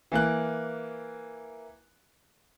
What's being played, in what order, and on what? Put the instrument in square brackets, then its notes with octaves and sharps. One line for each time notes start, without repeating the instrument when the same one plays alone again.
[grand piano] E3 A#3 F#6